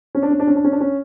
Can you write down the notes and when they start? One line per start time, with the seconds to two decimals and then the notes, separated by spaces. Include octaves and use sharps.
0.15 C#4
0.23 D4
0.31 C#4
0.40 D4
0.47 C#4
0.56 D4
0.64 C#4
0.72 D4
0.80 C#4